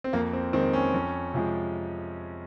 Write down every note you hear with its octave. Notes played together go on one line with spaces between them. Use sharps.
C4
F2 A#3
C4
D#3 G#3 C4
C#4
F2
C3 F3 G#3